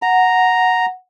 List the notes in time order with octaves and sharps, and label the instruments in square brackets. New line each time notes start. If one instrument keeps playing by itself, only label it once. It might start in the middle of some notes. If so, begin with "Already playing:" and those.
[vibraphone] F#5 [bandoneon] A#5